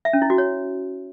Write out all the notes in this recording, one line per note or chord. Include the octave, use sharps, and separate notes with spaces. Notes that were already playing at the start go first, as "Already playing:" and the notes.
E5
C#4
E4
F#4
C#5